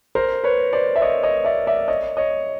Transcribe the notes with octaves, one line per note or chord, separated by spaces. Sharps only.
A#4 C5
B4 C#5
C5 D5
E5
C#5 D#5
C#5 D#5
D5 E5
D5 E5
C#5 D#5
C#5 D#5